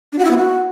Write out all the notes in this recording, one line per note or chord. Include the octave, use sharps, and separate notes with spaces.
D4
F#4
E4
B3
F#4